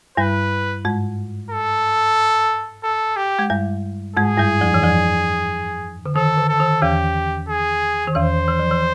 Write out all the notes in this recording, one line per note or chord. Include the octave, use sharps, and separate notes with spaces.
G2 G3 B4
G#2 G#3
A4
A4
G4
G#3
G2 G3
G#2 G#3 G#4
G2 G3
F2 F3
E3
F2 F3
D3
D#3 A4
D3
A4
D#3
E2 E3 G4
G#4
D#3
E2 E3 C5
E3
F3
E3